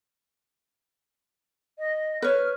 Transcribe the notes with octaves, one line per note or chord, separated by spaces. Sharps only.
D#5
B4 C#5 F6